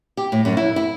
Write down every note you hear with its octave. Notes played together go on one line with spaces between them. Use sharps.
G4
A2
F#2
E4
E4